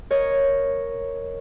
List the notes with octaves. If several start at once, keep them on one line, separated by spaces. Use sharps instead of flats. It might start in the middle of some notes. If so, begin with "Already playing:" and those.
A#4 C#5 D#5